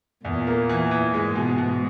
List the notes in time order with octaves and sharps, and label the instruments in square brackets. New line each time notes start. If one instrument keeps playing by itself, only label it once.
[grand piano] E2 [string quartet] A#2
[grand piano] A#3
E3
E3
[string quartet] G#2 [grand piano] G#3
[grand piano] B2
B2